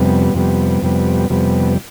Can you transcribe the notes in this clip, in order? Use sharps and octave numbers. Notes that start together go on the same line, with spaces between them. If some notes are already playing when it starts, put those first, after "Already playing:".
Already playing: F2 C3 G3 B3
F2 C3 G3 B3
F2 C3 G3 B3
F2 C3 G3 B3